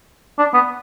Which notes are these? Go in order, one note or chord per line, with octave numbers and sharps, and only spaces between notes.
D4
B3